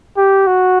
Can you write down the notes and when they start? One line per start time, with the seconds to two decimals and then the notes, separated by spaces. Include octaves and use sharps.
0.17 G4
0.47 F#4